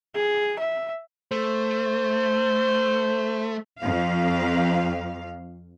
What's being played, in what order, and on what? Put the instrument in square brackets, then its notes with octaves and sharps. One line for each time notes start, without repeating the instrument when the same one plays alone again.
[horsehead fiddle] G#4
E5
[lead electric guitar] A3 [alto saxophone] C5
[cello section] F2 F5